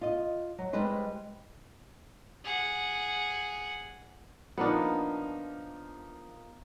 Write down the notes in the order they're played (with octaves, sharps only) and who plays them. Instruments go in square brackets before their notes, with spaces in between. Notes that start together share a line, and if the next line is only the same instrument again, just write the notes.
[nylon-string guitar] F4 D#5
F#3
G3 G#3 G#4 B4 C5 D#5
[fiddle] G#4 F#5
[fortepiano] F3 A#3 D#4 [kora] B3 D4